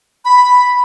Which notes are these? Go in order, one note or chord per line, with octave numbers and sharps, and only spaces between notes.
B5